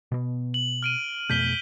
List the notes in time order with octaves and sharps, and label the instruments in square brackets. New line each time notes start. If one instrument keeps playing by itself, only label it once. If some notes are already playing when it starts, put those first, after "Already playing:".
[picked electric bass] B2 B3
[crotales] F#7
F6 D7 D#7
[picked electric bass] F2 B2 A3 [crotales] G6 B6 G7